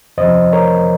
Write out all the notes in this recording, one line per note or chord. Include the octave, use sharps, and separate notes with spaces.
F2 C3 F3 C5 D#5
A#4 C#5